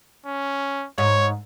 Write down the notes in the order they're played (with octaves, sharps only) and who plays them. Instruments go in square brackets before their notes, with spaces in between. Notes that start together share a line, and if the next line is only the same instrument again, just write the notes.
[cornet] C#4
[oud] G#2 [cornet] C#5